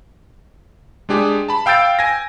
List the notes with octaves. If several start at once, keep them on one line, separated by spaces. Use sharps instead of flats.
G#3 D4 G4 G#4
A5 B5
F5 G5 E6 G6 A6 D7
G#5 G#6 A#6